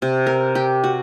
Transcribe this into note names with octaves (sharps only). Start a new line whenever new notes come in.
C3
A#4
G4
F#4